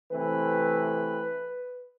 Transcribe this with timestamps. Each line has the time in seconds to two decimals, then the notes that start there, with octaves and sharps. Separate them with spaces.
0.12 C3 E3 A3 C4 B4